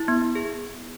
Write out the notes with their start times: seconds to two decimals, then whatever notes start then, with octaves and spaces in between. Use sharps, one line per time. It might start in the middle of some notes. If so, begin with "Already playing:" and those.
Already playing: E4
0.08 B3
0.22 B3
0.35 G#4